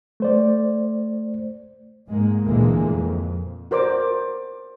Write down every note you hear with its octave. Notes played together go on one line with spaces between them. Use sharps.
A3 C5 D5
G#2 G#3 A#3
D2 A#2 D3 E3 G#3 A#3
F2
F#4 A#4 C5 D5 D6